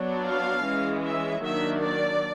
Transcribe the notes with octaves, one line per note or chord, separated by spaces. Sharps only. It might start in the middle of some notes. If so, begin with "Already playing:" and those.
Already playing: F#3 B3 D4
F5
E3 G#3 C#4
E5
D#3 F#3 A#3 D4 E5
D5